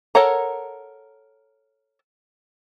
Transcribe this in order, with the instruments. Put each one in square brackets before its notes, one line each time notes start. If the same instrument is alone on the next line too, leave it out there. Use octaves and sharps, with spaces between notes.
[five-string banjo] A4 A#4 C#5 F#5 A#5